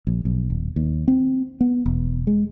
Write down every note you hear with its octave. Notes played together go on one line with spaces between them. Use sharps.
A#1
B1
D#1
D#2
C4
B3
E1
G#3